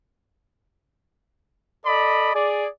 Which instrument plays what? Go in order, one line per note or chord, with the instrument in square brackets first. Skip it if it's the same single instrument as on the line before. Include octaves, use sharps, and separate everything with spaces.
[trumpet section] A4 D5 D#5 B5
G#4 D5